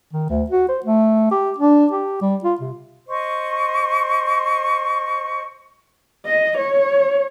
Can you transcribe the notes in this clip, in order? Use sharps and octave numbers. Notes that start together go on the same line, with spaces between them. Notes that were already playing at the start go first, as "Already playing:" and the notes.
D#3
D2
F#4
C5
A3
G4
D4
G4
G3
F4
C3
C5 D#5 C#6
D#5
C#5